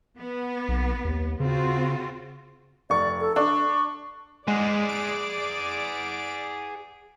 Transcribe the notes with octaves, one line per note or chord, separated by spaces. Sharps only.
B3
B1
D#2
C#3 C4 F4 F#4
F1 D5 C#6
A4
D4 C#6
G#3 G#4 D5 F#5
D7